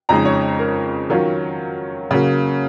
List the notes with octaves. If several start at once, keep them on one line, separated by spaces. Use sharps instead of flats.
F2 C#3 G#3 D#4 A#5
C#5
A#4
D#3 F#3 C#4 F4
C#3 F#3 A#3